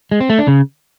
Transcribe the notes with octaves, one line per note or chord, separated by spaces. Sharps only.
G#3
C4
A3
D4
C#3